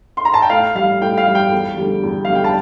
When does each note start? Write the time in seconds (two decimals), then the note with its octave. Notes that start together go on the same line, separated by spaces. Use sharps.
0.17 C6
0.25 A#5
0.34 A5
0.42 G5
0.50 A2 F5
0.75 G3 F5
1.01 A2 G5
1.18 F5
1.27 G3
1.35 G5
1.52 E2
1.77 D3 G3
2.03 E2
2.25 D3 G3 F5
2.35 G5
2.44 A5